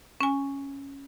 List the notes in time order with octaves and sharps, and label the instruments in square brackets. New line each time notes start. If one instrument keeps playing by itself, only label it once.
[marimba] C#4 G#5